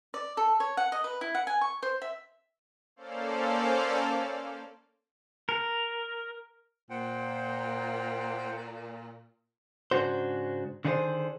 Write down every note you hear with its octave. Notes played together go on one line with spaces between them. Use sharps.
D5
A4
C#5
F#5
D#5
B4
E4
F#5
G#5
C#6
C5
E5
A#3 C#4 A4 C5 D5 F5
A#4
A#2 C5 F#5 G5
G#2 C#3 D4 F#4 C5
D3 D#3 D4 E4 G#4 C5